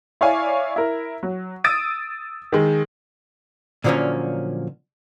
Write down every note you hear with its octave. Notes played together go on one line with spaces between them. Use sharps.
E4 C#5 D5 F5 G#5
E4 A#4
F#3
D#6 E6 A6 D7 D#7
D#3 G#3
A#2 D3 F3 F#3 A#3 C#4